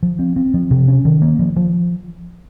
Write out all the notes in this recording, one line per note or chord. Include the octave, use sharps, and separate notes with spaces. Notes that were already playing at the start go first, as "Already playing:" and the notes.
F3
C4
C4
F3
C3
C#4
D#3
A#3
F3
F3